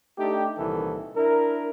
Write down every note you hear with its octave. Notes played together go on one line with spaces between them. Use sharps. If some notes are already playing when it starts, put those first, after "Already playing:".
A3 D4 D#4 G4
C2 A#2 D#3 E3 A4
D4 E4 A#4